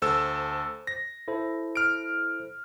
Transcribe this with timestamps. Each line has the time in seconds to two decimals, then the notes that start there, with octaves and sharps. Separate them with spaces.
0.02 D2 A4 C5 E6
0.87 A#6
1.28 E4 A4 C5
1.75 F6 D7